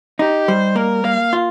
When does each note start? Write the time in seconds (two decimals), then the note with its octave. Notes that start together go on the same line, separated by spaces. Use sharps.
0.19 D#4 G4
0.48 G3 C5
0.76 A#3 A#4
1.04 A#3 F5
1.33 F4